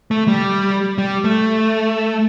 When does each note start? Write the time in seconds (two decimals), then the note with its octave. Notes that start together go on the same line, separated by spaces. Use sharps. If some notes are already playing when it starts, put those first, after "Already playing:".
0.11 A3
0.28 G3
0.98 G3
1.24 A3